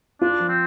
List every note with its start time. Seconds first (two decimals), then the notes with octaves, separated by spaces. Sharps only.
0.21 D4 F4
0.40 F3
0.48 C4